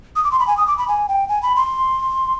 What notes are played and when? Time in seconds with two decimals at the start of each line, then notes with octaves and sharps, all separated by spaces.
0.16 D#6
0.24 D6
0.32 C6
0.39 B5
0.47 G#5
0.57 D#6
0.67 D6
0.78 B5
0.88 G#5
1.09 G5
1.29 G#5
1.43 B5
1.56 C6